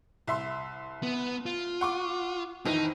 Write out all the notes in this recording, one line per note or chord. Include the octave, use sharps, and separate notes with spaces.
C2 E5 C6
B3
F4
F#5 C#6 D6
F2 D#3 E3 D#4